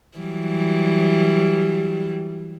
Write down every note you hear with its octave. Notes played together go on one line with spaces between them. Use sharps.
E3 F#3 G3